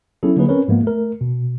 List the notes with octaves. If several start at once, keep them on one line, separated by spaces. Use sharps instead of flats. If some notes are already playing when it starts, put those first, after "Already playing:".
F#3 B3 C#4 E4 G#4 A4
D3 F#3 A#3 D#4 G#4 B4
C4 C#4 A#4 B4 C#5
G#2 F3 G#3 A#3 B3
A3 A#4
B2